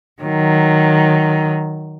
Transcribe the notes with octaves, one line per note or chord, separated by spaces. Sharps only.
D#3 F#3